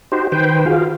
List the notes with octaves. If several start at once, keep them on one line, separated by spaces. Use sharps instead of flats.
D#4 F#4 G4 C5
D#3 B4 C5 G5
F4 F#4 G#4 F5